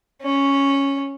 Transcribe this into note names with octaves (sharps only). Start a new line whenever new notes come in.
C#4